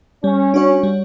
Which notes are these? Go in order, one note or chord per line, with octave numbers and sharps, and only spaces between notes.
G3 C#4
D4 F#4 C#5
G3